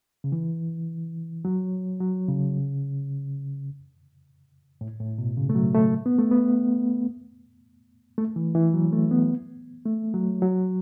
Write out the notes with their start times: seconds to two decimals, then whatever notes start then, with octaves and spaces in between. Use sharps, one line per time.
0.24 C#3
0.32 E3
1.45 F#3
2.01 F#3
2.29 C#3
4.81 A2
5.00 A2
5.18 B2
5.37 C#3
5.50 A3
5.55 F#3
5.74 A3
6.06 B3
6.18 A3
6.31 B3
8.18 A3
8.36 E3
8.55 E3
8.74 F#3
8.92 A3
9.11 B3
9.86 A3
10.14 F#3
10.42 F#3